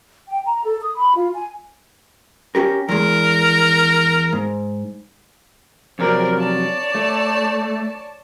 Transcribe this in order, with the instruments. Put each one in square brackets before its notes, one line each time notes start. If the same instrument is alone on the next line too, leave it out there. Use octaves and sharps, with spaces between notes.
[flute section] G5
A#5
A4
D#6
B5
F4
G#5
[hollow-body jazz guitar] C#4 G4 A#4
[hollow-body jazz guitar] E2 G#3 [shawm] A#4
[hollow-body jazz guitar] G#2
[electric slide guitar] F2 C3 F#3 [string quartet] A#4 C5 D5
[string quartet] C#5 D5 A5
[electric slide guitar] A3